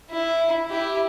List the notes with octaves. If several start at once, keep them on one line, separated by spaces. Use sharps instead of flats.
E4
E4 G4